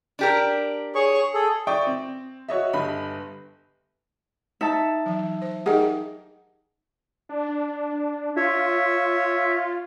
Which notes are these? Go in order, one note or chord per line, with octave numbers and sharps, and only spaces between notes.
D4 G4 A#4
G#4 C#5 C#6
G#4 A4
D5 E5 G5 C#6 D#6
C4
F#4 C#5 D#5 E5
G1 G2 D#5 B5
D#4 E5 A5
E3 F#3
C5
D#4 G4 G#4 A#4 D#5 F#5
D4
F4 C#5 E5